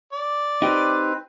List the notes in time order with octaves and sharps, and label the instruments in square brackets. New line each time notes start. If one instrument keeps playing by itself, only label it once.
[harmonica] D5
[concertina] C4 B4 [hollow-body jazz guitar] D#4 G4